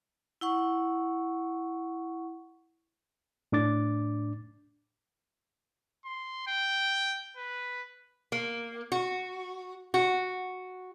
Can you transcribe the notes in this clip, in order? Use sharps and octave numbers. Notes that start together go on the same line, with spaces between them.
E4 F#5 C#6
A2 D4 D6 A6
C6
G5
B4
A#3
F#4
F#4